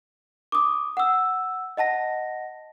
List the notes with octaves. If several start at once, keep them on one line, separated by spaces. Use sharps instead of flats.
D6 D#6
F#5 E6
D#5 F#5 A5 A#6